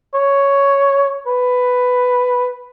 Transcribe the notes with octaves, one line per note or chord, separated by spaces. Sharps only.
C#5
B4